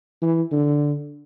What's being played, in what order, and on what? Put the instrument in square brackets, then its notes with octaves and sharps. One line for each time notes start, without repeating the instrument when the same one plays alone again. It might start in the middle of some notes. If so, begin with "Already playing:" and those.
[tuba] E3
D3